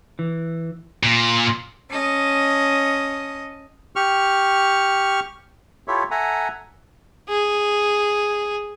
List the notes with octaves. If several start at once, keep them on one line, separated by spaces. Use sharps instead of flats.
E3
A#2
C#4 D#5 A5 D#6
G4 C#6 F6
E4 F4 G4 A4 C#5 E5
A4 E5 F#5 G#5 A#5
G#4